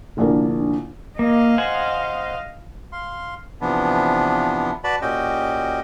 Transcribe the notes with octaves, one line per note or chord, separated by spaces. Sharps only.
F1 A#1 D3 D4 E4 A#4
A#3 D#5 F5
C5 F#5 G#5
F5 C6
C3 E3 F3 B3 D4
F#4 B4 D5 A5 B5
A#2 C#4 F#4 G4 D#5 G5